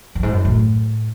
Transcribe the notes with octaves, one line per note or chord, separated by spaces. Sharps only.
F#2
G#2
F#2
A2